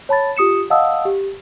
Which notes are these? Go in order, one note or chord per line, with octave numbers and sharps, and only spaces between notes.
C#5 A5 B5 A6
F4 G4 D#6 C#7 E7
D#5 F5 F#5 A5 D#6 E6
G4